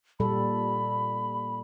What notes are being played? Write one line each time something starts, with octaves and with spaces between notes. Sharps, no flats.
A#2 G3 A4 B5